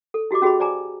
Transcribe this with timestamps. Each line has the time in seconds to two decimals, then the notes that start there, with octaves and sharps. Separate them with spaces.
0.14 A4
0.31 E4 F#4 G4 D#5 D6
0.42 C#4 F#4 G#4 D#5 B5
0.60 C5 D5 G#5 A#5 D6